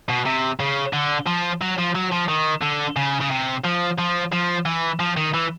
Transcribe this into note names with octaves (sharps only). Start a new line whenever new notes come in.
B2
C3
C#3
D3
F3
F#3
F3
F#3
F3
D#3
D3
C#3
C#3
C3
F3
F3
F3
E3
F3
D#3
E3